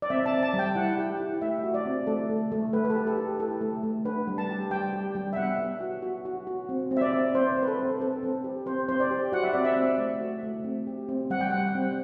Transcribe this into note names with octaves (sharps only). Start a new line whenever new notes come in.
D5
C4 E5
A5
C4
A5
G3
G5
E4 F#5
G4
E4
A3 E5
F#4
D5
C4
A3 A4
A3
A3
A3 B4
B4
A4
G4
A4
G4
E4 A4
A3
A3
D4 B4
G3
A5
G4
G3 G5
G4
G3
E5
B3 F#5
B3
F#4
F#4
F#4
F#4
C4
C4
E5
D5
C4
C4 C5
C4
B4
A4
C4
C4 A4
C4
G4
C4 C5
C4 C5
D5
G4
F#4 F#5
E5
C4 D5
E5
C4
A3
F#4
A3
C4
G4
C4
G3 F#5
G5
G3 F#5
C4